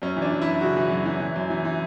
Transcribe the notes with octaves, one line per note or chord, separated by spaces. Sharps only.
F#2 C#4
E3
D4
E3
E4
F#2
C#3 F#4
E3
F#2
E3
E3
F#2
E3
E3